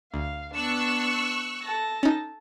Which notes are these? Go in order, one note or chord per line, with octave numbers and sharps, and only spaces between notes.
D2 F5
B3 D4 C#6 E6 F#6
A4 A5 A#6
C#4 D#4